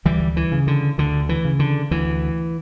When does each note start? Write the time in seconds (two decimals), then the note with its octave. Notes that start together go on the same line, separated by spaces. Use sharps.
0.05 D2 E3 G3
0.37 E3
0.52 C#3
0.67 D3
0.98 D2 D3
1.29 E3
1.45 C#3
1.59 D3
1.91 D2 E3